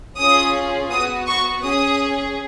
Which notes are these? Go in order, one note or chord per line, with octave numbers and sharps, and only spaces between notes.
C#4 F4 G#4 D#6
B3 F#4 D#6
C#6
C#4 G#4 D#6